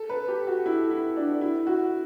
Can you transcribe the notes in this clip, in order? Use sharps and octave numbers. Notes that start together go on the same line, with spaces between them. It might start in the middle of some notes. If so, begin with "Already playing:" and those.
Already playing: A4
B4
G4
F#4
E4
E4
D4
E4
F#4